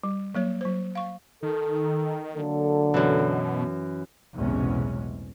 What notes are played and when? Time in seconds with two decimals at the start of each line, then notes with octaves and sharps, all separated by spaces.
0.04 G3
0.34 F#3 A#3 C#5
0.61 F#3 C5
0.95 F5 C#6
1.43 D#3 A4
2.34 D3 F#3 A#3 A4
2.94 F#2 B2 E3
4.36 B1 E2 A2 C3 G#3 C#4